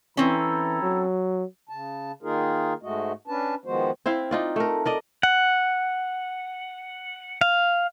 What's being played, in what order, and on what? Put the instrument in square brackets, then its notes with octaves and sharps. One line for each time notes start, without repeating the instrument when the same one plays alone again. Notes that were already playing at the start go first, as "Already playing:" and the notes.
[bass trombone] E3 [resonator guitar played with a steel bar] C4 C#4 [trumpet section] E4 A4 A#5
[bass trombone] F#3
[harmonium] C#3 A5
D#3 A#3 D#4 F4 G#4 A#4
G#2 G#3 A3 F#4 D#5
C#4 D4 B4 A5
D#3 F3 G#3 B3 F#4 C5
[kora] C4 E4 C5 F5
D#4 F4 D5
A3 A#4
A#4 D5 D#5
[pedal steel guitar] F#5
F5